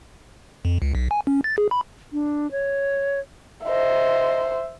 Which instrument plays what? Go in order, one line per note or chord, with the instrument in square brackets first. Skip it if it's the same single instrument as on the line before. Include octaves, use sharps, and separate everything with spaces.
[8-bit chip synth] F2
C#2
B1
G#5
C#4
A6
G#4
B5
[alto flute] D4
C#5
[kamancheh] C5 E5 [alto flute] D#5